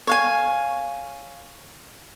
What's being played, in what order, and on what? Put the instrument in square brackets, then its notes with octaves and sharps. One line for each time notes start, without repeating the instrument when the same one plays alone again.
[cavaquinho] C#5 F5 G#5